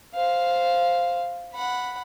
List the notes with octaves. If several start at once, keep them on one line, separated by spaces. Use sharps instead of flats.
C5 F5
F#5 B5